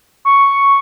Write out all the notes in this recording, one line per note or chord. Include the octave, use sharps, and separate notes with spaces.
C#6